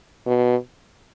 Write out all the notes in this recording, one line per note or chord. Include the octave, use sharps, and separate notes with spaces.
B2